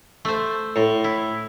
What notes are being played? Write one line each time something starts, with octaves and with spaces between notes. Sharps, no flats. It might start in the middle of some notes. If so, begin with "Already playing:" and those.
A3 C5
A2
E4